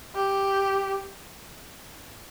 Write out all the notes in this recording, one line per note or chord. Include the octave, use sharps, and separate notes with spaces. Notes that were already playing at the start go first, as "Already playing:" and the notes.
G4